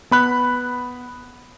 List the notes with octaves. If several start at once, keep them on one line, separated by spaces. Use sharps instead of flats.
B3 B5 F#6